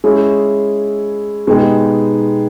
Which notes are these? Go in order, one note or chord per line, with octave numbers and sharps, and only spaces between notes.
G#3 C#4 E4 G#4
B2 G#3 B3 D#4 G4